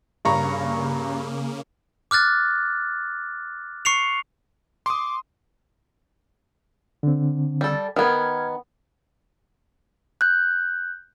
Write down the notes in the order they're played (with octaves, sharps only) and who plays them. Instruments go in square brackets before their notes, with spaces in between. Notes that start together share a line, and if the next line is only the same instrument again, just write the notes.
[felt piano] G2 A#5 C#6 [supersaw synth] C#3 A#3
[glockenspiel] D6 F6 F#6 A6
C#6 C7 C#7 F7
[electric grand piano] C6 D#6 [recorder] D6
[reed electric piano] D3 C4
[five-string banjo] G3 A4
[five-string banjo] D#3 B3 [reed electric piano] F6 G#6
[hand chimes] F#6 G6